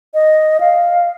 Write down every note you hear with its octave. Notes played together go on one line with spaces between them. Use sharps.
D#5
F5